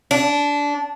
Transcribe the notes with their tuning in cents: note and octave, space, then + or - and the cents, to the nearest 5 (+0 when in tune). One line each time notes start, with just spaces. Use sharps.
D4 -20